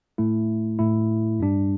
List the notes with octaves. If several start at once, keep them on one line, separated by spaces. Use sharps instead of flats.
A2 A3 E4
A2 A3 E4
G2 G3 D4